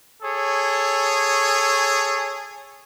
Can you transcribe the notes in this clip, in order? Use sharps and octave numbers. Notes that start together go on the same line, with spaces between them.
G#4 A4 C#5